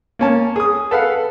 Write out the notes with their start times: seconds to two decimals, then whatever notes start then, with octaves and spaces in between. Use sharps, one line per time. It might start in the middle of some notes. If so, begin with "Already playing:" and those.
0.19 A#3 C#4 A5
0.56 G#4 D#6
0.91 A4 B4 F5 F#5